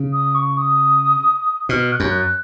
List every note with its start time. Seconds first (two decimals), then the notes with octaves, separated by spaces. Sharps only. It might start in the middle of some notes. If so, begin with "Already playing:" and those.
Already playing: C#3
0.13 D#6
0.35 C#6
0.57 D#6
1.69 B2 F6
1.92 F#6
2.00 F#2
2.14 F#6